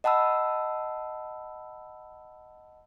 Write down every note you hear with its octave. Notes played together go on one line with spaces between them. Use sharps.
D#5 F#5 A5 B5 E6